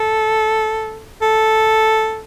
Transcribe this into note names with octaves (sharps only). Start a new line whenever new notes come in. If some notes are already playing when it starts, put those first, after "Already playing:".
Already playing: A4
A4